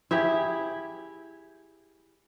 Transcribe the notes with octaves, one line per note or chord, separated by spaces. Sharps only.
E4 G4 G#4 E5